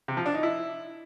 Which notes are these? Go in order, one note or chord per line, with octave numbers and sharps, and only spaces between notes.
C3
F3
D4
D#4
E4